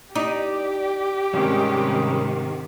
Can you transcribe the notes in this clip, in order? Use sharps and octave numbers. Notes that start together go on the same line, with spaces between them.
D#4 G4 D5
G#2 C3 D#3 G3 G#3 C#4